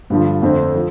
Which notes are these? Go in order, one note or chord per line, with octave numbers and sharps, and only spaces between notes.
G2 D3 F3
F2 D3 A3 C4
F3